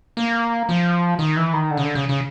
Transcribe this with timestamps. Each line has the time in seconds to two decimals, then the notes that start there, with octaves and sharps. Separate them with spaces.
0.17 A#3
0.69 F3
1.19 D#3
1.36 E3
1.53 D#3
1.71 D3
1.77 C#3
1.83 D3
1.95 C#3
2.09 C#3